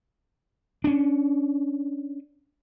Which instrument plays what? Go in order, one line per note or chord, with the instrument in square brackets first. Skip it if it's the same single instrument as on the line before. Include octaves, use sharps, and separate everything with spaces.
[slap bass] C#4 D4